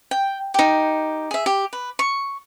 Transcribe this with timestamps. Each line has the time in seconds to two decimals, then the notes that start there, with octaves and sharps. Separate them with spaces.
0.11 G5
0.54 D#4 G4
1.31 G#4 E5
1.46 G4
1.73 B4
1.99 C#6